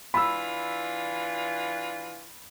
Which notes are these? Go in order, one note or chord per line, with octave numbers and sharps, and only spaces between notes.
E3 D4 F4 B5 E6